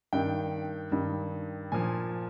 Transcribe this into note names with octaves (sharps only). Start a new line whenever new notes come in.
G2 D#3 G5
G2 D#3
A#2 F3 G#5